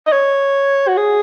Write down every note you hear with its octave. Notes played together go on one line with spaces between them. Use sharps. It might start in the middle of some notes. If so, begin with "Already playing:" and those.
D#5
C#5
F#4
G#4